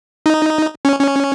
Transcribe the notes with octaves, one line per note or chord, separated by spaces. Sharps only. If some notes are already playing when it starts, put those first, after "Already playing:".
D#4
C#4
C#4